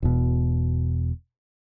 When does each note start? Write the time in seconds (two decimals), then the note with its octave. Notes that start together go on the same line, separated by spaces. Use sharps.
0.02 E1 B2